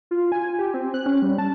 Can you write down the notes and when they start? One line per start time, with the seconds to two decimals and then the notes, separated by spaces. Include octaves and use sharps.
0.11 F4
0.32 G#5
0.59 G4
0.74 C4
0.94 F#6
1.06 C#4
1.22 G3
1.38 A5